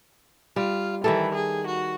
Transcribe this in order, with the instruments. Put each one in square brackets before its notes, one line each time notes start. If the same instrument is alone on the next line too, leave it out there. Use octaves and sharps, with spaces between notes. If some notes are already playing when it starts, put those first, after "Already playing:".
[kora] G3 [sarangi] F4
[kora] D#3 G3 A4 [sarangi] E3
[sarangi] G#4
F#4